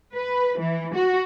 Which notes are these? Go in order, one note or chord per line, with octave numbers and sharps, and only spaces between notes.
B4
E3
F#4